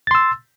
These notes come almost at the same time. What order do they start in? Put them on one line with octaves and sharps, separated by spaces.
A6 C6 E6